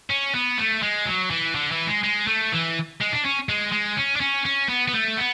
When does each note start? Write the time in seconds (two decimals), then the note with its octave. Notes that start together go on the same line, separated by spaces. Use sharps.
0.10 C#4
0.35 B3
0.58 A3
0.83 G#3
1.06 F#3
1.31 E3
1.55 D3
1.71 E3
1.87 G#3
2.03 G#3
2.27 A3
2.52 E3
3.01 G#3
3.12 D4
3.25 C#4
3.49 G#3
3.72 G#3
3.97 C#4
4.16 D4
4.21 C#4
4.45 C#4
4.69 B3
4.88 B3
4.94 A3
5.17 B3